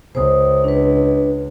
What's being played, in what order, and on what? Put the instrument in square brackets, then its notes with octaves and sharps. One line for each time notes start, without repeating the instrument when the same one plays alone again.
[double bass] C#2 [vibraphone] C5 D#6
[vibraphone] D4 B4